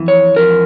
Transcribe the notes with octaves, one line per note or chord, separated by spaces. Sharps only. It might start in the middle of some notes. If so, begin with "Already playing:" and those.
Already playing: F2 E3
C#5
F2 A#4